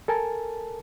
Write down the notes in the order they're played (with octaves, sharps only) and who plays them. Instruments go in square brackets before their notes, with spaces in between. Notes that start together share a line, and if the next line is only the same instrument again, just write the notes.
[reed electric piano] A4 A#4 G#5 A5